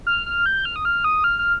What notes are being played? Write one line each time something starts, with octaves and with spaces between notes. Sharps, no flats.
F6
F6
G6
F6
D#6
F6
D#6
F6
F6